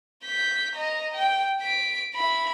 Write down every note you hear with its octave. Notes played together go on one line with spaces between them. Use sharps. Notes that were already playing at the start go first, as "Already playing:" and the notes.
G6 B6
D#5 A#5
G5
B6 D7
E4 B5